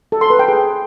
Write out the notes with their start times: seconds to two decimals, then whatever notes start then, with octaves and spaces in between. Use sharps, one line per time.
0.12 A4
0.21 C6
0.30 B4
0.39 G5
0.48 G#4